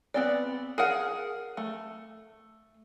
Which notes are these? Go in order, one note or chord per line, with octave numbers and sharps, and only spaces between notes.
B3 C4 D5
G#4 A#4 F#5
A3